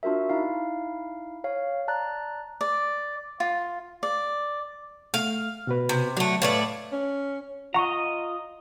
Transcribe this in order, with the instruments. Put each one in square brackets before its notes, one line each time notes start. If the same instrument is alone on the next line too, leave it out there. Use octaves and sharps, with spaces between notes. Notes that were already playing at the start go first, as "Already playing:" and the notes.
[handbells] D4 F4 F#4 A#4 E5
D#4 E4 F5
C#5 F5
D5 A5 A#5 F#6 A6
[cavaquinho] D5
F4
D5
[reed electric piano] A3 [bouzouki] F5
[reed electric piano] B2 F#4 B4
[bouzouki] C3
[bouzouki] D3 A3 [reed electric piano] F#3 F#5
[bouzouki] A2 A3 D5 [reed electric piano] B4 C#5 F5
[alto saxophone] C#4
[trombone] F4 [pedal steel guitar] D#5 A#5 [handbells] F#5 C#6